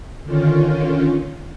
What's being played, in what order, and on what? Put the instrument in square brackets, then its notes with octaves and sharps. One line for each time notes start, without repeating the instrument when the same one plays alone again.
[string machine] D3 D#3 C#4 F4